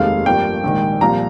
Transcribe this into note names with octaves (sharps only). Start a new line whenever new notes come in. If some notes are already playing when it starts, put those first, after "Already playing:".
Already playing: F1 D#2 D#3 G#3 F5
G1 G2 F3 A#3 G5
A#1 G#2 D#3
C2 A#2 F3 A#5